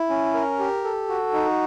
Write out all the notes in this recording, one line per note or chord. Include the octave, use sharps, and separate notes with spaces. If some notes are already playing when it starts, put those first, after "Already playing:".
Already playing: E4
C#4
A#4
G4
A4
F#4
D#4